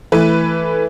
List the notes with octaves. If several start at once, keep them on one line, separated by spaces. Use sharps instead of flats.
E3 A3 B4